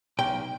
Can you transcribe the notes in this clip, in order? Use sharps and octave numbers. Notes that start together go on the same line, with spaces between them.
B1 G5